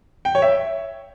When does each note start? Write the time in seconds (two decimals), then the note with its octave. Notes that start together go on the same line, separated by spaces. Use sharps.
0.25 G5
0.35 C#5
0.42 E5